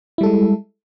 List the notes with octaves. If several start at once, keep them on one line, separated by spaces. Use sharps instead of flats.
G3 G#3 E4 A4